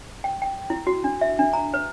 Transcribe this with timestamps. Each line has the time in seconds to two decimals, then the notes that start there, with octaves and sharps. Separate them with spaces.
0.24 G5
0.42 G5
0.70 E4
0.87 F#4
1.04 D4
1.21 E5
1.39 D4
1.53 A#5
1.74 B4